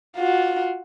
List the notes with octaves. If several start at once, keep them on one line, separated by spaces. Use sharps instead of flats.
F4 F#4